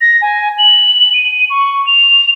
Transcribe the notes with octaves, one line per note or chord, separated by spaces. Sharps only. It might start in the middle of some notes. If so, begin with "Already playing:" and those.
A#6
G#5
F#7
D#7
C#6
F7